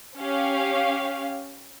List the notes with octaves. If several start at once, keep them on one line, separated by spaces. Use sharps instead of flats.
C#4 G4 F5